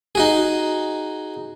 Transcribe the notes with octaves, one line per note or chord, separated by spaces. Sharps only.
D#4 F#4 G#4